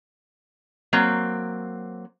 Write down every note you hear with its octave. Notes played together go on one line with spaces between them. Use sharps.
F#3 A#3 C4